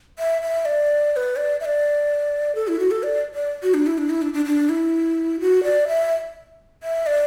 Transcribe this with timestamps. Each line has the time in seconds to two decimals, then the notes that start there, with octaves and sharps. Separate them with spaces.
0.19 E5
0.42 E5
0.65 D5
1.13 D5
1.16 B4
1.36 D5
1.60 E5
1.65 D5
2.55 A4
2.68 E4
2.79 F#4
2.91 A4
3.03 D5
3.34 D5
3.63 F#4
3.74 D4
3.87 E4
3.98 D4
4.09 E4
4.22 D4
4.33 D4
4.45 D4
4.69 E4
5.40 F#4
5.63 D5
5.88 E5
6.83 E5
7.06 D5